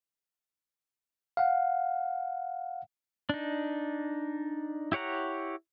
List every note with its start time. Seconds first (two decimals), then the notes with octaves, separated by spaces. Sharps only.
1.37 F5 F#5
3.29 D4 D#4
4.92 E4 G4 C#5 F#5 A#5